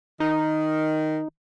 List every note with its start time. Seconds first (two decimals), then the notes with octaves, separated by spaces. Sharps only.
0.20 D#3 D#4